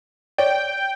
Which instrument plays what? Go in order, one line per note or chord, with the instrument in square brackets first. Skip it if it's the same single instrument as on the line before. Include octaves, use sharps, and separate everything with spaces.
[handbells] C#5 D5 [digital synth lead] G5